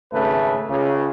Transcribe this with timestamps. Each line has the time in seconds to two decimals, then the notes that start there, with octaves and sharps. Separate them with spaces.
0.13 G#1 C#3 A3 B4
0.69 C#2 C#3